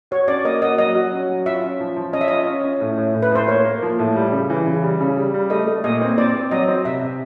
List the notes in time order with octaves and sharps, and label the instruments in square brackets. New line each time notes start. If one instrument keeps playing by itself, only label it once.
[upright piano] F#4 [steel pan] C#5
[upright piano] C#4 [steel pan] D5
[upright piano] A#3 [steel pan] D#5
[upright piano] F#4 [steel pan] D#5
[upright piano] F#3 [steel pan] D#5
[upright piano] F#4
C#4
F#3
[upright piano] F4 [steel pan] E5
[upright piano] C#4
F3
F3
[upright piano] C#4 [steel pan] D#5
[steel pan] E5
[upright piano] F4 [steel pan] D#5
[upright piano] C#4
C#4
A2
A2
A2
[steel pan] B4
[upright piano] A2 [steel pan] C5
[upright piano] A#3 [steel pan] C#5
[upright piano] A#3
F3
A2
G3
C#3
E3
C#3
G3
C#3
G3
G3
[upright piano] A3 [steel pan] D#5
[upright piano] A3
[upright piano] A#2 [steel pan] D#5
[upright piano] C4
[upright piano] C4 [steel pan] D5
[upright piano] C4
[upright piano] F#3 [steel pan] D#5
[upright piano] C4
[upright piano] C3 [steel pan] E5
[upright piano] C3